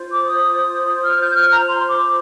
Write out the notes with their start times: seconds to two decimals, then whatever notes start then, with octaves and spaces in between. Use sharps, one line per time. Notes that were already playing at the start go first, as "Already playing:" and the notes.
Already playing: F4 C5
0.10 D6
0.25 D#6
1.04 F6
1.20 G6
1.35 F6
1.51 A#5
1.66 C6
1.87 D6